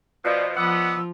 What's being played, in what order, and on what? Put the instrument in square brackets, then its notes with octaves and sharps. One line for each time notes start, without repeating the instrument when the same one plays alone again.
[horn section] B2 F3 [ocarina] D5
[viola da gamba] F3 [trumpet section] B3 [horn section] D5 D#5 F#5 [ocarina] E6